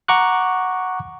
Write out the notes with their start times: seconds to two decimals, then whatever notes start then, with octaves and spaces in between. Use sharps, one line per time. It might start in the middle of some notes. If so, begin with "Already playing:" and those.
0.08 F#5 A#5 C#6 D6 F#6